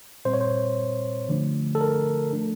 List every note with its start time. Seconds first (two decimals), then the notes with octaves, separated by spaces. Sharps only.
0.25 A#2 G3 C4 C5
0.34 C#5
0.41 C5
1.29 D3 F3 A3 D4
1.75 A4
1.81 A#4
2.33 F3 A3 D4